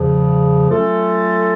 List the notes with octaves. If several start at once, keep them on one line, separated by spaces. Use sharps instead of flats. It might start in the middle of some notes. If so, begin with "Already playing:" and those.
Already playing: E2 C#3 F3
F#3 A3 C#4 F4 A4